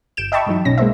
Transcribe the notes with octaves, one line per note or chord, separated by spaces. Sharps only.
G1 G6 D7 E7
D#5 E5 G5 A5 B5 C#6
G2 E3 F#3 D#4
B1 B2 C#4 A#6
G#3 A#3 C5 E5